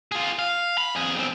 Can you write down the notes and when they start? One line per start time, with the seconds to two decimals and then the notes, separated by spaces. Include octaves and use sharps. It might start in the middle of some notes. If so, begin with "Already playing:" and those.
0.12 F4 G#4
0.39 F5
0.78 B5
0.95 F2 G#4
1.16 B1 C4